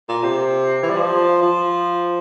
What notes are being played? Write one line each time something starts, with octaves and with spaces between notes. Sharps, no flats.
A#2
C3
E3
G3
F3
F3